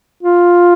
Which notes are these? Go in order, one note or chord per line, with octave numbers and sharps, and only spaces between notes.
F4